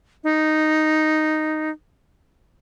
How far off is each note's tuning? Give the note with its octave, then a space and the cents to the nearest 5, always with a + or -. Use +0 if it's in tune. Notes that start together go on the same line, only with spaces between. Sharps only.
D#4 -5